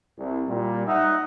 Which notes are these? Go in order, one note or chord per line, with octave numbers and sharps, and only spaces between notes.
C2
A#2 G3
D#4 E5 F#5